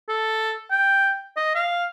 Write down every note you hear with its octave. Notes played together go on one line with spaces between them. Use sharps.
A4
G5
D#5
F5